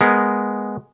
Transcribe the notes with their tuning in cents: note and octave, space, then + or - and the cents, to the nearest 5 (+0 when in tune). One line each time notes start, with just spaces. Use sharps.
G#3 +0 B3 +0 A#4 +0